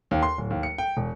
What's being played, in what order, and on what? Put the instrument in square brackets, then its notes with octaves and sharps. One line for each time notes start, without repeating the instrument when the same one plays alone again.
[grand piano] D#2
C6
D1
D#2
C#7
G5
E1